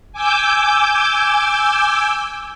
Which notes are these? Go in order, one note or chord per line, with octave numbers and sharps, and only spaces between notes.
G#5 D6 E6 G6